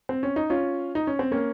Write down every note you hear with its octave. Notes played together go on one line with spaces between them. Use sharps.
C4
C#4
D#4
C#4 F4
D#4
C#4
C4
A#3 C#4